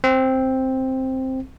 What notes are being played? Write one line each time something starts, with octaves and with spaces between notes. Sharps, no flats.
C4